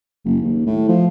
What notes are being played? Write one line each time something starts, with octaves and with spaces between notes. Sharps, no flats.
F#1
D#2
A2
F3